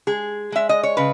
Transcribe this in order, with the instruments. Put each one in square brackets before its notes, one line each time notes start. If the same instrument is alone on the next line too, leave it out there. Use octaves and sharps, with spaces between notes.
[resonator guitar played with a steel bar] G#3 G#4
G#3 E5
D#5
C#5
C#3 B4